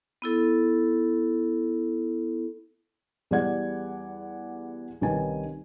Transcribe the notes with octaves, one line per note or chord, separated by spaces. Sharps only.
B3 E4 A4
E2 G3 G#4 D5 F#5 G#6
C2 D#3 C#4 B4 G#5